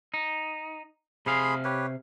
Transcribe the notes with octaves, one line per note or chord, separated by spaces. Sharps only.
D#4
C3 G#4 F5 B5 C6
G4 B4 C#5